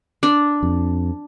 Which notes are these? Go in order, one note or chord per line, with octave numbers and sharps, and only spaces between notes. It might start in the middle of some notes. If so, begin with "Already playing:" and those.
D4
F2